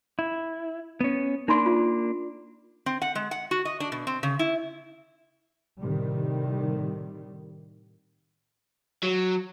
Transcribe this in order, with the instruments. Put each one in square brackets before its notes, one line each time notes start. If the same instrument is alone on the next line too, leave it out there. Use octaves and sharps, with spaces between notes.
[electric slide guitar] E4
B3 C#4
[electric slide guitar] A#3 D4 [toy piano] D#4 B5 C6
[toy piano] F4
[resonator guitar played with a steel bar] C4
F#5
G#3
F#5
F#4
D#5
D4
B2
C4
C#3
E4
[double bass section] A2 C3 D#3 G3
[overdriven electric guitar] F#3